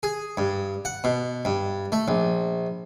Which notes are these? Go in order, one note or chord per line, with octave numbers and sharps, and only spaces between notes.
G#4
G2
F#5
B2
G2
A3
A#1